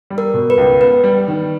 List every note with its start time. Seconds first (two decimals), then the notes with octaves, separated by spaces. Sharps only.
0.10 G3
0.18 A#4
0.34 B2
0.50 B4
0.58 C#2
0.81 B3 B4
1.04 G3
1.28 D#3